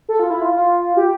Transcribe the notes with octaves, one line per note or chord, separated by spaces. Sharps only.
A4
F4
E4
F4
F4
G4